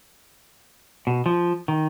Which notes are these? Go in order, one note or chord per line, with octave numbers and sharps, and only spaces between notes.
B2
F3
D#3